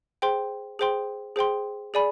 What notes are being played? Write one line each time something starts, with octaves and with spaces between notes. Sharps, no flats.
G#4 C5 G5 C6
G#4 C5 G5 C6
G#4 C5 G5 C6
G#4 D5 G#5 B5